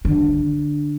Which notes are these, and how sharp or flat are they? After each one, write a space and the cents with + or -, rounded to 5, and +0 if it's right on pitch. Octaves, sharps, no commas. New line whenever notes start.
D3 +5